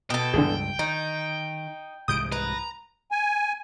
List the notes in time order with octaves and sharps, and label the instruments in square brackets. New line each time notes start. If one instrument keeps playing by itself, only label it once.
[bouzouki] B2 A4 [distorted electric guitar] G5
[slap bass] C#2 G2 G#3 [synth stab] D3 E3 G#4
[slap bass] D#3 [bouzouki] D#4
[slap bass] C2 G#2 E3 [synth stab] D#6 G6 D7
[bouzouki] B4 [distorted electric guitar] A#5
[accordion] G#5